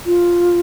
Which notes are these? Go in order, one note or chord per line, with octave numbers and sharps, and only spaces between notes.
F4